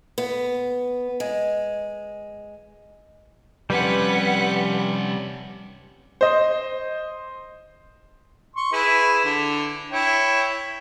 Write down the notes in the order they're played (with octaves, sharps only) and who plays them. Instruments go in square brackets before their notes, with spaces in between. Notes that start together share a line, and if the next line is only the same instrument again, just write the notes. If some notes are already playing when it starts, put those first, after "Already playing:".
[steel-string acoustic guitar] B3
G#3
[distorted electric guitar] C3 F3 [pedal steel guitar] G3 C#4 [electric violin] B4 F#5
[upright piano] C5 D#5
[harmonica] C6 C#6
E4 G#4 B4
D3
E4 C#5 G5